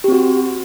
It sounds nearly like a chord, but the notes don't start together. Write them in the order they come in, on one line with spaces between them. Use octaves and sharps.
G4 C4 F#4